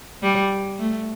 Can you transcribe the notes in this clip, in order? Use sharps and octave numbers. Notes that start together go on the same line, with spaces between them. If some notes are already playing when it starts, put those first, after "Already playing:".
G3
A3